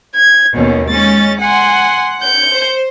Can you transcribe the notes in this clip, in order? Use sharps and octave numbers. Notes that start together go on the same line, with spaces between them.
G#6
D#2 B2 C#4
G#3 C#4 A6
F#5 G#5 C6
G6 C#7
C5